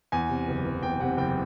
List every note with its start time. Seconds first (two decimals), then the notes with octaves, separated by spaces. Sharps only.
0.12 E2 G#5
0.29 C3
0.48 F#1
0.65 F#1
0.82 E2 G5
1.00 C3 F#5
1.17 F#1 G5